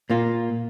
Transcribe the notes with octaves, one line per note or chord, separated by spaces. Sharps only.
A#2 A#3 F4